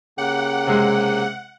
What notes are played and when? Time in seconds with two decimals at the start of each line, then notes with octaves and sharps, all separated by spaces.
0.18 C#3 A#3 G4 F#5 G5
0.67 C3 G#3